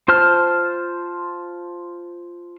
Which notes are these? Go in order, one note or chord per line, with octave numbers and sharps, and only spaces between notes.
F4 C5 A5 F6